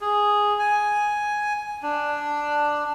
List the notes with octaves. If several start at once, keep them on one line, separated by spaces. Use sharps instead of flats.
G#4
G#5
D4